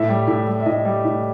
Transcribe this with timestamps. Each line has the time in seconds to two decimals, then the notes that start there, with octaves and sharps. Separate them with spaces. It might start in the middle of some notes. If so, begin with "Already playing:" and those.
Already playing: A2 E5
0.09 G3
0.28 A2
0.47 G3
0.60 E5
0.66 A2 D#5
0.85 G3
1.05 A2